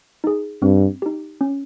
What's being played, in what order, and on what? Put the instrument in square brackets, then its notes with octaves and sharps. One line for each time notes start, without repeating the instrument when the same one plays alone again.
[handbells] D#4 G#4
[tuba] G2 [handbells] C4
[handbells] D#4 G4
C#4